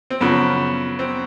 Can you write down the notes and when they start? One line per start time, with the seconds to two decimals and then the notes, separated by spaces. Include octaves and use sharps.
0.10 C4
0.21 F#2 C#3 F3 B3
0.99 C4